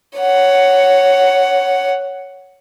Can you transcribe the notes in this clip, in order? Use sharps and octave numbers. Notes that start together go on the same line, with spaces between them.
C#5 F#5